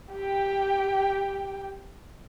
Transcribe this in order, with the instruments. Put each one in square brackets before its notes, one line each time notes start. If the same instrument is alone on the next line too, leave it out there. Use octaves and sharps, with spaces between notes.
[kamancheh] G4 G5